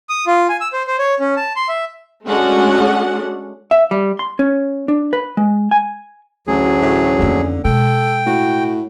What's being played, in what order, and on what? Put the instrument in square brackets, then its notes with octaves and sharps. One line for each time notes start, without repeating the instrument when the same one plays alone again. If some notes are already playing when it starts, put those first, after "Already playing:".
[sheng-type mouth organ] D#6
F4
G#5
E6
C5
C5
C#5
C#4
A5
C6
E5
[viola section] G#3 A3 C#4 D4 F#4 F#5
[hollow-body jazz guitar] E5
G3
C6
C#4
D4
B4
G#3
G#5
[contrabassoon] A1 [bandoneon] D2 F#3 G#4
[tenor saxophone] A2
[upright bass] F2 A#3 [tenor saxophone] D3
[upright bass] B2 G#3 [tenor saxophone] A4 [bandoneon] G5
[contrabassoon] A2 [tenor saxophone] F#4